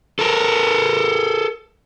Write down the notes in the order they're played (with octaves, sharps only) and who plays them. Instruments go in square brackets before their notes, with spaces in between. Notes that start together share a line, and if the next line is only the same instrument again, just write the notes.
[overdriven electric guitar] A4 A#4